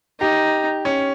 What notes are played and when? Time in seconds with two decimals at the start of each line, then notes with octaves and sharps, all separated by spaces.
0.20 D#4 G4
0.85 C#4